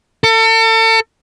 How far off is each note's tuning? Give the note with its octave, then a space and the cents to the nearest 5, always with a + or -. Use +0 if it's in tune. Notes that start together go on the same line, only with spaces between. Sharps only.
A4 +35